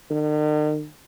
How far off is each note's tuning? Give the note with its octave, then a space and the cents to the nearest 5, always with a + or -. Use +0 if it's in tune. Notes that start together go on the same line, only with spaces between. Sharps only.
D#3 -45